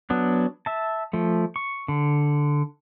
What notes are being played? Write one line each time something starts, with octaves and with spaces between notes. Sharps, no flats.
F#3 B3 D4
E5 A5
F3 A3
C#6
D3